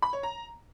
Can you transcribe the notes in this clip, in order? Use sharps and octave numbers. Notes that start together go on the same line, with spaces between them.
B5
C#5
A#5